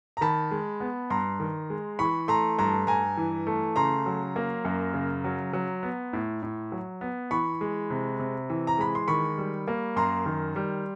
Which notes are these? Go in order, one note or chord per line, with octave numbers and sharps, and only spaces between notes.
A#5
D#3 A5 B5
G#3
B3
G2 A#5 C6
D#3
G#3
E3 B5 C#6
A3 A#5 C6
G2 A#5 C6
G2 G#5 A#5
E3
A3
C#3 A#5 C6
F#3
A#3
F#2
C#3
F#3
F#3
B3
A2
A2
F#3
B3
E3 B5 C#6
G#3
C3
C3
E3
A#5
G#3 B5
C6
D#3 B5 C#6
G3
A#3
F#2 A#5 C6
D#3
G3